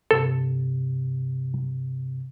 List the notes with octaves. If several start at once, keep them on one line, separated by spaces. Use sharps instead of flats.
G2 C3 A4